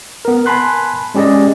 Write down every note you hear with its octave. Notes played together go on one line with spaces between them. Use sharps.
B3 A#4
G#5 A5 B5 C6 F#6
G#3 C#4 G4 G#4 D5 D#5